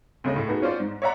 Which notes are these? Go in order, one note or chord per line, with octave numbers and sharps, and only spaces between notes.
D2 C#3 C#5 D#5
A2
B3 D#4 F#4 G#4
C#4 F4 C5 D5
G#2
C#5 D5 E5 F#5 A#5 C6